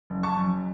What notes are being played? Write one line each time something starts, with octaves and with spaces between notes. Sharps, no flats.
F#1
A5 C#6
F#2